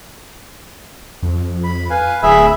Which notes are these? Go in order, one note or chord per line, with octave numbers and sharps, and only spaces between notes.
F2
B5
B4 F5 G#5
D1 G#4 E5 B5